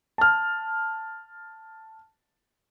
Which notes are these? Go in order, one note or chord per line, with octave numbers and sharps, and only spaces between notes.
A5 F6